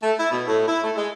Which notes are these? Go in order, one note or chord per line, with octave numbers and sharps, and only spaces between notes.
A3
E4
B2
A2
E4
A3
G#3